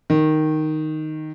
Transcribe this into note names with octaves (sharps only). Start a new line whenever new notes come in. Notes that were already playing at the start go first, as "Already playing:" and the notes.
D#3